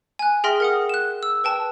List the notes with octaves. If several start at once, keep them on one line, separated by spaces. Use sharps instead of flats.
G#5 F#6
G#4 E5 G5 C6 F6 A#6
A#4 F#5 D#6
F#6 E7
E6
B4 G5 A5